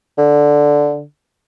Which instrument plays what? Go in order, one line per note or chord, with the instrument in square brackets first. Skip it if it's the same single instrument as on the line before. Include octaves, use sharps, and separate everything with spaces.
[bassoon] D3